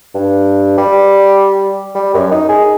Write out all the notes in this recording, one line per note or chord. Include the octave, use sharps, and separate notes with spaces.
G2
G3
G3
F#2
D#4
G#4